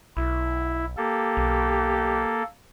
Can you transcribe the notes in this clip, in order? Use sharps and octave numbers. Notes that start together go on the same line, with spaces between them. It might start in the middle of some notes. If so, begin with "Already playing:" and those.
B1 E4
A#3 G4 A4
B1